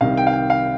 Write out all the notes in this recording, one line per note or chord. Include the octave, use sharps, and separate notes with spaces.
C2 C3 D#3 G3 F5
G5
F5
G5
F5